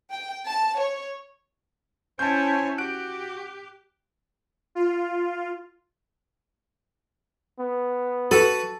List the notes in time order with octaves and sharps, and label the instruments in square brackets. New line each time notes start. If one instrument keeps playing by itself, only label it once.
[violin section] G5
A5
C#5
[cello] C#4 E4 [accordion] C5 C#5 G#5 [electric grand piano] A5 G6
[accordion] F#4 [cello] G4 [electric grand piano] F#6 D7
[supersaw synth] F4
[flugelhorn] B3
[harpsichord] F#4 B4 [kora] A4